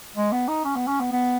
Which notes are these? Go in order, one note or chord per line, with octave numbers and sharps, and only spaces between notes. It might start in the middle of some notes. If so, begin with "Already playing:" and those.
G#3
B3
D#4
C#4
B3
C#4
B3
B3